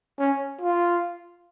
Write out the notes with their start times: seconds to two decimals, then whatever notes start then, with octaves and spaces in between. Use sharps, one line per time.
0.18 C#4
0.61 F4